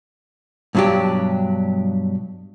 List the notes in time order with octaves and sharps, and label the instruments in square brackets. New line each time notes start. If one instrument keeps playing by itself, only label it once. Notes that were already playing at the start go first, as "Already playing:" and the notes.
[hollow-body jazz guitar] G2 B2 F#3 D4 G4